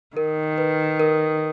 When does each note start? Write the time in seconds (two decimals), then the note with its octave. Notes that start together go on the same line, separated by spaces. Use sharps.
0.16 D#3 A#4
0.58 B4
1.00 A#4